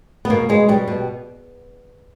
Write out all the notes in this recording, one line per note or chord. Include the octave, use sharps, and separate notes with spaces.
B3
B2 A#3
B2 G#3
B2 G3
B2